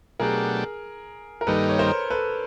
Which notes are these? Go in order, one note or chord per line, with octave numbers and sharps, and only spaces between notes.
B2 F#3 A3 D4 G4 G#4 A#4
A#4
G2 D#3 G3 A#3 D#4 A4 B4
C#5
A#4 C5
A4 B4